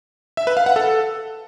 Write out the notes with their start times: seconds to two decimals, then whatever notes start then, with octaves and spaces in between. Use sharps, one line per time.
0.37 E5
0.47 B4
0.57 F5
0.66 F#5
0.76 A4